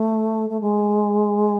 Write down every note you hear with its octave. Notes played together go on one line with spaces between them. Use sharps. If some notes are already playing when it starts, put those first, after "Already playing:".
Already playing: A3
A3
G#3